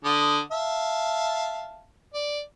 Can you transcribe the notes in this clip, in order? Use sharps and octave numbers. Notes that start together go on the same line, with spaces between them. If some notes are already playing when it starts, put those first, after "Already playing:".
D3 D#6
E5 F5 A5
D5